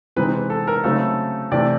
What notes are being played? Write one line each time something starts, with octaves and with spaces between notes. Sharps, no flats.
C3 E3 G#3 C4 D#4 B4
B4
A4
A#4
C#3 F#3 A3 C4 D#4 A4
C3 E3 A3 D5